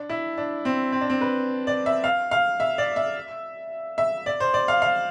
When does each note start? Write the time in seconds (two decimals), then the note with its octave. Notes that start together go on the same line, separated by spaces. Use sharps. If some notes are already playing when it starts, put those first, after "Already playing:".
Already playing: D4
0.09 E4
0.38 D4
0.65 C4
0.92 C4
1.01 D4
1.10 C4
1.21 B4
1.67 D5
1.86 E5
2.04 F5
2.31 F5
2.60 E5
2.78 D5
2.96 E5
3.98 E5
4.26 D5
4.40 C5
4.54 D5
4.68 F5
4.82 F5